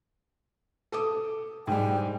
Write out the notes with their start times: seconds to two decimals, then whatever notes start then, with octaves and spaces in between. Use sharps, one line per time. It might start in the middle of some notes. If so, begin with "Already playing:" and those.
0.92 A4 D6 D#6
1.67 G#2 G3 G5